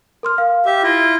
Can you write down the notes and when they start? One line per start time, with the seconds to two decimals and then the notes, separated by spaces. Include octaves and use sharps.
0.23 A#4 C6 F6
0.38 F5
0.65 G4 E5
0.83 E4 F4 A#6